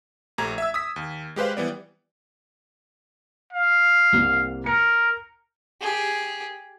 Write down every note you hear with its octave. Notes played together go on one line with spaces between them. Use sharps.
A#1 A3 G4 A#5 G#6
E5 E6
D#6 E6 B6
D#2
G#3 G4 B4 C5 F5
E3 G3 B3 D5
F5
C2 C3 A#3
A#4 C#7
G4 G#4